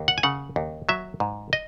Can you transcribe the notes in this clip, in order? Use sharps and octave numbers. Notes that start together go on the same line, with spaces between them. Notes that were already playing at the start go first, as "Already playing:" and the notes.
Already playing: D#2
F#5
G#5
C#3 F#5
D#2
F#3 E5
G#2
D#5